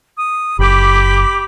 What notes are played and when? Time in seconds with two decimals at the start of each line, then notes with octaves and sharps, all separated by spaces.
0.17 D#6
0.59 F#1 G4 B5 D6